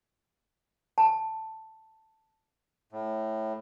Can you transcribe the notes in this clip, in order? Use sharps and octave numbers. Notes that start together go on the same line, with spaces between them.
A5
A2